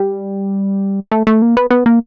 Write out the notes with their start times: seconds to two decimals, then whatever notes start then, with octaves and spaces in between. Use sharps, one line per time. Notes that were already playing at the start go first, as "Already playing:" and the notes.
Already playing: G3
1.12 A3
1.27 A3
1.42 A#3
1.57 B3
1.71 B3
1.86 A#3